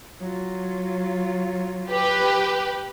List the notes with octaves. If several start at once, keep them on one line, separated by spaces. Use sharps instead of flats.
F#3 F4
G4 B4